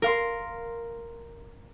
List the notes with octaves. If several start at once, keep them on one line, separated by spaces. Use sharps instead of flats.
A#4 F5 C6